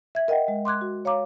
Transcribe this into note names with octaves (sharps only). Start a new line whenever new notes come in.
E5 G#6
A#4 D#5 F#5 G5
G#3
C6 D6 F#6 G#6
F#4
C#5 F5 A#5 D6